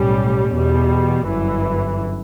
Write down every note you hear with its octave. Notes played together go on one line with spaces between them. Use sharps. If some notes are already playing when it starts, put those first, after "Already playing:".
Already playing: B1 A2 G3 C#4
E2 B2 G3
G1 F#2 E3